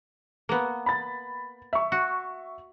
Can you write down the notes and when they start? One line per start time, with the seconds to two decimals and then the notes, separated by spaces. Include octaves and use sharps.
0.49 A#3 B3
0.86 B5 A6
1.73 E5 C#6
1.92 F#4